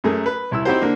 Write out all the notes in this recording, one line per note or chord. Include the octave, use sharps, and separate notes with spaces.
F#2 A3 G#4 A#4
B4
C2 E4 E6
C4 D#4 E4 F#4 G4 C5
D3 A#3 D4